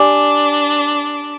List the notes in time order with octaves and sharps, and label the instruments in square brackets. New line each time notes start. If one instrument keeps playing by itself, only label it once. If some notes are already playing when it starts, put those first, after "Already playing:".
Already playing: [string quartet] D4 [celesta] G4 D5 G#5 D6